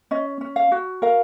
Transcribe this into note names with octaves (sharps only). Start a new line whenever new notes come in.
C#4 D#5
C#4
F5
F#4
A#4 F5